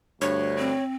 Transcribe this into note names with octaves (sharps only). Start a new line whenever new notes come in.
D2 G2 C#5
C4